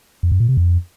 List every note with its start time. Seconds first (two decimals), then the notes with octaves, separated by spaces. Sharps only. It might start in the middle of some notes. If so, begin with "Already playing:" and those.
0.23 F2
0.32 F#2
0.40 A#2
0.49 C3
0.57 F2